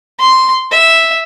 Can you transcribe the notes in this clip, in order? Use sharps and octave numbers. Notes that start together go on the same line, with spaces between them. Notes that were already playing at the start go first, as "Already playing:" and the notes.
C6
E5